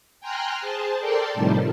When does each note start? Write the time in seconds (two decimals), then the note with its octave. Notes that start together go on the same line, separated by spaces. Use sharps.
0.20 G5 G#5 A#5 C6 F6 F#6
0.60 G#4 C5 A5
0.99 A4 A#4 D5 G5 A5 C6
1.34 A2 C3 D#3 F3 G3